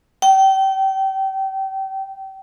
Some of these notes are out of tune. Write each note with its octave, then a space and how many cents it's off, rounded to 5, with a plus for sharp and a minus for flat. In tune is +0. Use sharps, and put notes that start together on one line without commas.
G5 -30